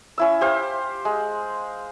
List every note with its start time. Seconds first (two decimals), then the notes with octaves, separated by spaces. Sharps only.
0.18 C#4 E4 E6
0.41 G4 C5 F5
1.05 G#3